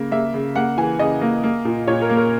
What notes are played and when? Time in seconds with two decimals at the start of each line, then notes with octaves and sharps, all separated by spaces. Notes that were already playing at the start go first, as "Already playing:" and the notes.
Already playing: C#3 A#3
0.11 A#3 E5
0.34 C#3
0.56 A#3 F#5
0.78 E3 G#5
0.99 C#3 D#5
1.22 A#3
1.44 A#3
1.65 A#2
1.87 A#2 C#5
2.02 A#4
2.09 A#3
2.17 A#4